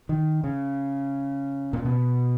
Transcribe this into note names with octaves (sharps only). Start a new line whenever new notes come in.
D#3
C#3
A#2
B2